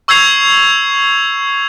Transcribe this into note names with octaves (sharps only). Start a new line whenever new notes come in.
C#6 E6 G6 G#6 C7 F7